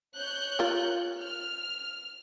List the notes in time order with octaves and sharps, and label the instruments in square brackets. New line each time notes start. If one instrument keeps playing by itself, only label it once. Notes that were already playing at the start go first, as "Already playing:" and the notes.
[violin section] C#5 F#6 G6
[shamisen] F4 A#4
[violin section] F6